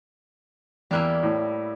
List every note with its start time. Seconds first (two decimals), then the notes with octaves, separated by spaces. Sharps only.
0.91 E2 G3 A#3 E4 F#6
1.23 A2